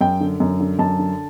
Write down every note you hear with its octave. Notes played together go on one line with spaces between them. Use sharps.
F#2 G5
D3
F#2
D3
F#2 A5
D3